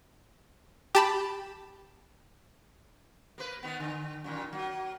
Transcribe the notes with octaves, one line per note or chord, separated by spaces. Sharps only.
G4 A5 B5
A#3 B4
D#3 B3
D3
F#2 A#2 D#3
F#3 A#3